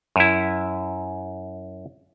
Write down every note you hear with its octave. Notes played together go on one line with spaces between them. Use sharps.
F#2 E4